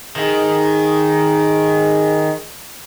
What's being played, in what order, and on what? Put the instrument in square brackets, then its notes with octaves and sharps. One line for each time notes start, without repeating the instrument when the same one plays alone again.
[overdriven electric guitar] D#3 [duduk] G#4